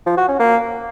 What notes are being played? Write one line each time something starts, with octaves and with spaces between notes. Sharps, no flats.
F3
F#4
C#4
A#3